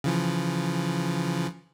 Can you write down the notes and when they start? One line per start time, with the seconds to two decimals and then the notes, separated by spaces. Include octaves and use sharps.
0.04 C#3 E3 F3